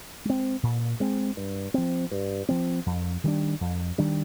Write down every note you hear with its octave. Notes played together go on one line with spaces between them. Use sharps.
G#3 C4
A#2
G#3 C4
G2
F3 C4
G2
F3 C4
F2
D#3 G3 D4
F2
D#3 G3 D4